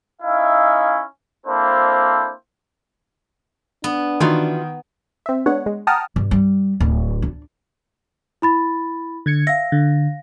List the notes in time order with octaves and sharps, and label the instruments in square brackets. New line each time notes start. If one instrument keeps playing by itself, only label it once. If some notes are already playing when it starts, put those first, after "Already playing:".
[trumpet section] C#4 D#4 E4 E5 F5
A#3 C4 D4 E4 A4 C5
[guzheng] B3 [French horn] D4
[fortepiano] D#3 [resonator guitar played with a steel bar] E3 F4 F#4
[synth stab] C4 E5
G#3 B3 D4 C#5 F#5
G#3
F#5 G5 A5 A#5 D#6 F6
[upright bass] G2
G3
D1
D4
[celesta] E4 B5 A6
[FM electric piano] D3 G#6 C#7
[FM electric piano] E5 [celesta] F5 A#6
[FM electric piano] D3